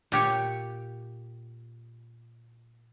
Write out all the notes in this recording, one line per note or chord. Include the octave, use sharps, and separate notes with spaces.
A#2 G4 C#5